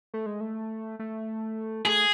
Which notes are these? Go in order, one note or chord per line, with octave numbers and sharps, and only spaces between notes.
A3
G#3
A3
A3
A3 G#4